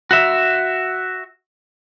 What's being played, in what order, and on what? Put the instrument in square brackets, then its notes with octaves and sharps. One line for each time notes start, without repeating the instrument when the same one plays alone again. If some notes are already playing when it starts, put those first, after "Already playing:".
[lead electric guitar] F#4 E5